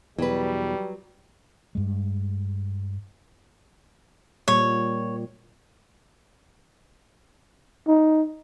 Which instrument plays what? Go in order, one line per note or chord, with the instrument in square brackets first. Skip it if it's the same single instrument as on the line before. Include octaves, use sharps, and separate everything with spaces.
[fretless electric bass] E2 B2 [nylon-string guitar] F#3 B4 [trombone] G3
[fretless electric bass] G2 G#3
[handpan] A#2 G3 A#3 [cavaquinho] C#5
[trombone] D#4